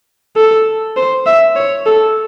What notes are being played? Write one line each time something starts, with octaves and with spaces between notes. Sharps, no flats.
A4
C5
E5
C#5
A4